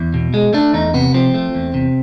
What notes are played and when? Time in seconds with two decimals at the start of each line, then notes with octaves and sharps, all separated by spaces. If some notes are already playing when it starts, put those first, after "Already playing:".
Already playing: E2 E4
0.14 B2
0.34 G#3
0.53 A3 D4
0.74 E2 D#4
0.94 C3 B3
1.14 F3 C4
1.34 A3
1.55 E2
1.74 C3